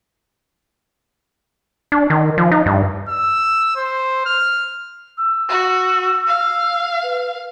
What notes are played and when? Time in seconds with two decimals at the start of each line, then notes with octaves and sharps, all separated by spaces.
1.92 D4
2.10 D#3
2.38 F3
2.52 D#4
2.66 G2
3.09 E6
3.77 C5
4.26 F6
5.18 E6
5.49 F#4
6.28 F5
7.03 B4